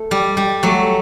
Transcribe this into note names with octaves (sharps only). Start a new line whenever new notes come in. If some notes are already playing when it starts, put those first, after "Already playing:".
Already playing: A3
G3
G3
F#3 A3